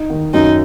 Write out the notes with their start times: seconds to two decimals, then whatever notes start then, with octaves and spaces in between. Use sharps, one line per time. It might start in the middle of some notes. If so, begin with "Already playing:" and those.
Already playing: D#4
0.10 D#3
0.34 F#2 D#4